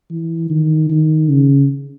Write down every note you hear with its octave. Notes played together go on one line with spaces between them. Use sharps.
E3
D#3
D#3
C#3